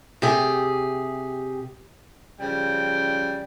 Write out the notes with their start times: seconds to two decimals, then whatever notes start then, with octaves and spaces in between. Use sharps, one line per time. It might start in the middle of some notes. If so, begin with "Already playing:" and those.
0.22 C3 G4 G#4
2.40 C#3 F3 G3 G5